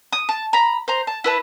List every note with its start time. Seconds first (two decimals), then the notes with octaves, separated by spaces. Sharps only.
0.13 D#6
0.29 A5
0.53 A#5 B5
0.88 C5 A#5
1.07 A5
1.24 E4 B4 A5